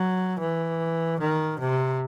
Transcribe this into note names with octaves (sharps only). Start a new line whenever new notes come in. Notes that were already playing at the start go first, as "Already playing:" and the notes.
Already playing: F#3
E3
D#3
C3